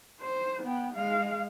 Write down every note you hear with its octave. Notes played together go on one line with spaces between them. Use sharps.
C5
B3 G5
G#3 F5